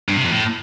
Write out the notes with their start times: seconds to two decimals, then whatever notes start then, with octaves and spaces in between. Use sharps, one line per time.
0.09 G2
0.16 C3
0.23 F2
0.31 A2